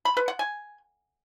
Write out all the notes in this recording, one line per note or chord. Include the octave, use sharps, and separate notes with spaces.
B5
B4
F#5
G#5